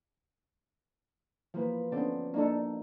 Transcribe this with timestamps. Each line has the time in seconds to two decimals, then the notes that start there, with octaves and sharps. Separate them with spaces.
1.54 E3 F3 A#3 B4
1.92 D3 B3 C#4 A4 C5 D5
2.34 A#3 D4 D#4 A4